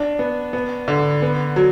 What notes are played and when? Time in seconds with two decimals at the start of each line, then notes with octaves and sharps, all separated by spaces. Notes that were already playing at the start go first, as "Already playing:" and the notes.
Already playing: D4
0.19 B3
0.53 B3
0.88 D3
1.22 B3
1.56 F#3